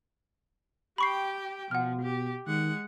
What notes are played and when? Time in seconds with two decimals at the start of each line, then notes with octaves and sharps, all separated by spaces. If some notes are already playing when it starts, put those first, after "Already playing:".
0.98 G4 G5 B5 C#6 C7
1.71 B2 F3 F#5 F6
2.02 G4
2.47 D#3 G#3 F#5